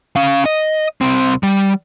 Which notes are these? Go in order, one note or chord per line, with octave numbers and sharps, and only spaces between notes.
C#4 F5
D#5
C2 C4
G3